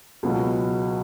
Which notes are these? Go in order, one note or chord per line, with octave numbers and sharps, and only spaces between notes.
C#2 B2 F#3